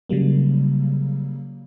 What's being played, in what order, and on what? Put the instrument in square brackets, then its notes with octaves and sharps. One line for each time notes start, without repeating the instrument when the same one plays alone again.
[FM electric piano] C#3 F#3 G3 A#3